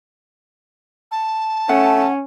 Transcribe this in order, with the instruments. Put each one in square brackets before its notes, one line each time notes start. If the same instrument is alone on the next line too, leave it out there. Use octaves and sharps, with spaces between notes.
[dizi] A5
[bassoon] A3 [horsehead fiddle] C#4 [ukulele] F#5